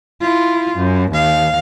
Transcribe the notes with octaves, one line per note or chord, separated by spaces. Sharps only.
E4 F4
F#2
D#2 F5